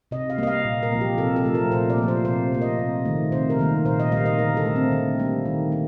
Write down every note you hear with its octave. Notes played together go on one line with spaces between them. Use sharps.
C3 D#5
F5
G3 A#3 D#5
F5
A#2
A#4
F3 A#3
G4
C3 A4
A4
F3 A3
A#4
A#2 C5
D5
F3 A#3
C5
C3 C5
F3 A#3
D#5
C3
D#3 A3
C3 C5
A#4
D#3 G3 A#3
A#2 C5
D#5
G3 A#3 F5
D#5
D3 A#4
A4
A3
C4
D3
G3 A#3
D#3
A#3